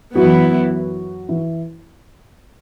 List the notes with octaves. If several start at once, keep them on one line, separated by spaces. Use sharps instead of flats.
F#2 E3 F#3 B3 E4 F#4
E3 E4